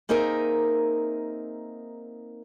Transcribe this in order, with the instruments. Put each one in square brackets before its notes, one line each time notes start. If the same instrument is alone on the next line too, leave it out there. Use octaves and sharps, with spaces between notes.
[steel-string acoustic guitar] A#3 C4 D#4 G#4 A#4 E5